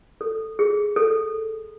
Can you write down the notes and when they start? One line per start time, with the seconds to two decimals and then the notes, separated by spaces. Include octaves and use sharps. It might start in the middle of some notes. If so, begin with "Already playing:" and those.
0.21 A4
0.59 G#4
0.96 A4